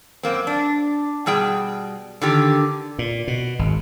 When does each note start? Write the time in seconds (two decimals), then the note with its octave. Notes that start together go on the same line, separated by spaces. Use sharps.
0.23 F#2 A#3 C4
0.47 D4
1.26 B2 G3 G#4 G5
2.21 D3 D#3 G4
2.99 A#2
3.27 B2
3.59 G#1